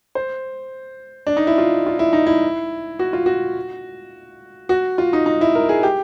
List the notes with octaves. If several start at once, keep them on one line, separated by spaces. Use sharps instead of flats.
C5
D4
D#4
E4
F4
F4
E4
D#4
E4
F#4
F4
F#4
F#4
F4
D#4
D#4
E4
A#4
G#4
G4